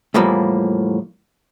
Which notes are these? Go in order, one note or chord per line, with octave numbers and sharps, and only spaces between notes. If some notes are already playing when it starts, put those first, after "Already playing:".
E2 A2 E3 F3 G3 A#3